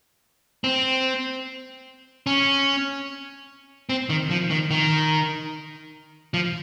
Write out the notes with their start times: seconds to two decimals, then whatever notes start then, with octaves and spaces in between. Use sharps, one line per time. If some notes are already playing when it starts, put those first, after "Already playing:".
0.64 C4
2.27 C#4
3.89 C4
4.09 D#3
4.31 F3
4.51 D#3
4.71 D#3
6.34 F3